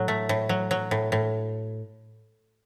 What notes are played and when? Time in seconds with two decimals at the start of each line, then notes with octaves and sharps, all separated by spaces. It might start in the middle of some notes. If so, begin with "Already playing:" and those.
Already playing: A2 F#3
0.08 A3
0.29 A2
0.49 F#3
0.71 F#3
0.91 A2
1.12 A2